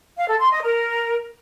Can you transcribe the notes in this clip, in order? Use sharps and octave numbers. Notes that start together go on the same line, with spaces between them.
F5
A4
C6
D#5
A#4